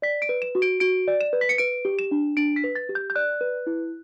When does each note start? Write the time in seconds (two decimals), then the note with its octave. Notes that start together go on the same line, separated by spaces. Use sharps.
0.02 D5 B6
0.22 D7
0.29 B4
0.42 E7
0.55 F#4
0.62 D7
0.80 F#4 D7
1.08 D5
1.21 E7
1.33 B4
1.41 B6
1.49 C#7
1.58 B4 D7
1.85 G4
1.99 E7
2.11 D4
2.37 D4 D7
2.56 B6
2.64 B4
2.75 A6
2.89 G4
2.95 G6
3.10 G6
3.15 D5 F#6
3.41 B4
3.66 E4